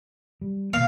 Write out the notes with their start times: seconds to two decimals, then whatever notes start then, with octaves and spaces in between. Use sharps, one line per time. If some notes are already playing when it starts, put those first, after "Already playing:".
0.41 G3
0.73 B2 D#3 A#3 F5